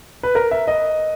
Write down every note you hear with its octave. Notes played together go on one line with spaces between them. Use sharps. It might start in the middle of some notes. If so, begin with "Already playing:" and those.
B4
A#4
E5
D#5